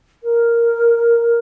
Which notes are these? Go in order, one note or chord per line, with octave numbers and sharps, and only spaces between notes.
A#4